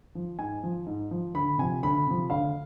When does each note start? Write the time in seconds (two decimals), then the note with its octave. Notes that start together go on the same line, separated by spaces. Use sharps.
0.15 F3
0.39 G#2 G#5
0.63 F3
0.86 G#2
1.11 F3
1.34 D2 B5
1.58 C3 F3 G#5
1.83 D2 B5
2.06 C3 F3
2.30 D2 F5